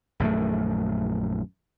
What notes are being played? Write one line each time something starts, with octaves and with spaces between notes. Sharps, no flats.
A#1 F#2 D#3 A3